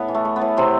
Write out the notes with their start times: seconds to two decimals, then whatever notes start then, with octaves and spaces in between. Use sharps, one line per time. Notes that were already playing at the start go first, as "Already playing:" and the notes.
Already playing: A2 B3
0.08 E3
0.15 A3
0.25 A3
0.36 B3
0.41 A2
0.57 A2 C3 C4